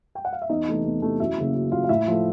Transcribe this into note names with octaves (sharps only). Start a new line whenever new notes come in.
G5
F#5
F5
E5
E2 D#4 D#5
C3 E3 A3
E2
C3 E3 A3
F#2 E4 E5
C#3 F#3 A#3
F#2
C#3 F#3 A#3 F4 F5
F5
A2 E4 E5
F3 A3